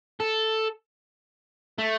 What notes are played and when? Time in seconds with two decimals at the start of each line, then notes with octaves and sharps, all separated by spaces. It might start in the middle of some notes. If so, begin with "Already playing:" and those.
0.20 A4
1.79 A3